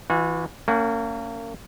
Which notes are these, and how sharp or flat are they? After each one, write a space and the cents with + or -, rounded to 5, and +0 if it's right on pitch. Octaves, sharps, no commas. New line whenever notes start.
E3 +0 F#4 -45
A#3 -30 C#4 +15 F#5 +0